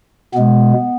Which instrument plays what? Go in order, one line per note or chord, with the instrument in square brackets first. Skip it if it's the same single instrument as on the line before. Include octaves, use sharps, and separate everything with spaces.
[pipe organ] B2 G#3 B3